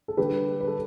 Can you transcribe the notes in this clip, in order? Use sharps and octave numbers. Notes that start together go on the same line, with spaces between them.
A4
D3 G3 G4 B4
B4
A4